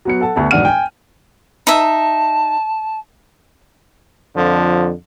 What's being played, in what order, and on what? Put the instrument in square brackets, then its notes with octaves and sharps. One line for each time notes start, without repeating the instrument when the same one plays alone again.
[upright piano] F#3 B3 C#7
A4 F#5 A5
D2 B3 A5
E1 G#2 D4 F#5 F6 D#7
G5 G#5
[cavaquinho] D#4 E5 [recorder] A5
[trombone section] F2 D3 F3